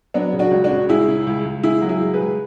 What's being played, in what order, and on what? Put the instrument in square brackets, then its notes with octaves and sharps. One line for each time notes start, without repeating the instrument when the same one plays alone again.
[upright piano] F#3 B3 D4
C#3
D4 F#4
C#2
D4 F#4
C#3
C#2 E4 G#4
C#3
C#2
C#2
C#2 E4 G#4
F#3
E4 G#4
C#2
G#4 B4
C#2